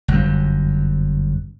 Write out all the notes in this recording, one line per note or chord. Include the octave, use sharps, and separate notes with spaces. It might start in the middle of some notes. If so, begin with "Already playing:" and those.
G1 F#2